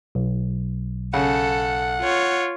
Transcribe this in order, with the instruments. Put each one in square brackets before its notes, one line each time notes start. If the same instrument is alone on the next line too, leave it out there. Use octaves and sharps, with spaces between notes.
[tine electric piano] B1
[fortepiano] C#3 [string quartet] A4 [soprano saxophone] F#5
[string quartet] F4 C#5